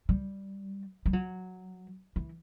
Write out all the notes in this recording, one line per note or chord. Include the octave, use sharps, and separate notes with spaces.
G3
G3
F#3
E3